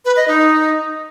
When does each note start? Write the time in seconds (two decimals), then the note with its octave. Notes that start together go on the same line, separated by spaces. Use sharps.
0.05 B4
0.16 D#5
0.28 D#4